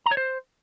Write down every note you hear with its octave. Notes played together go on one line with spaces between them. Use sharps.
A#5
C#5
C5